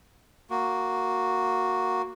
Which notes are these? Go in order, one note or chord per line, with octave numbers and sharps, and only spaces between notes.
A#3 F#4